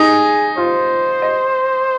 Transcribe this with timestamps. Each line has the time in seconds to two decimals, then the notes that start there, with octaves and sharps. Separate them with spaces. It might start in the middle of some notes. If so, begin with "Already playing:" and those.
Already playing: D#4 G#4
0.58 F4 C5
1.22 D#5